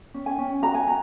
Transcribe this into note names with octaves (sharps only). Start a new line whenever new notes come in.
C#4
G#5
C#4
F#4 A#5
G#5
F#4 A#5